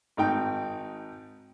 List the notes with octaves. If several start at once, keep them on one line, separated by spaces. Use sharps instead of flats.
G#1 D#4 G5